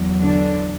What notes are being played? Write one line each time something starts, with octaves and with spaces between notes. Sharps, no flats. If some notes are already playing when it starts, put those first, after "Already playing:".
Already playing: E2 F#3
D3 D4